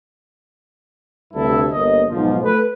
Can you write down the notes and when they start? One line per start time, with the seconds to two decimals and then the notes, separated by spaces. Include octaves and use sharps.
1.33 D2 G2 C3 E4 A4
1.71 G1 A#3 D#5
2.10 B1 G#2 F3
2.42 A3 A4 B4